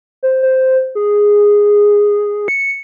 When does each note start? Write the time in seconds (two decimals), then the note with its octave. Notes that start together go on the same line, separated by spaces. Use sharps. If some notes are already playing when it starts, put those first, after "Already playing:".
0.23 C5
0.43 C5
0.95 G#4
2.48 C#7